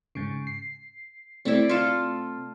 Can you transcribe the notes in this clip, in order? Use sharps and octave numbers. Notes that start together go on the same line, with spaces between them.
G#2 C#3
C7
C3 A3 C4 E4 D5
F4 A4